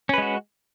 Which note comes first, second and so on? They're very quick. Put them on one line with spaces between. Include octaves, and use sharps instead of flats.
C#4 B4 G#3 F#4